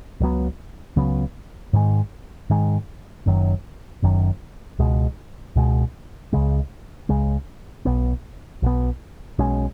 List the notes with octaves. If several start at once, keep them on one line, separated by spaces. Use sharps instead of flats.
C#2 C#3 F#3 B3
C#2 C#3 F#3 B3
G#2 D#3 G#3
G#2 D#3 G#3
F#1 F#2 D#3 F#3
F#1 F#2 D#3 F#3
C#2 B2 G#3
C#2 B2 G#3
C#2 C#3 G#3
C#2 C#3 G#3
B1 B2 B3
B1 B2 B3
B1 B2 G#3 C#4